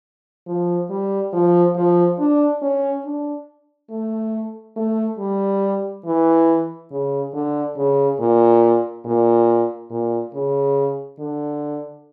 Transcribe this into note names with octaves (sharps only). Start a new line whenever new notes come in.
F3
G3
F3
F3
D4
C#4
D4
A3
A3
G3
E3
C#3
D3
C#3
A#2
A#2
A#2
C#3
D3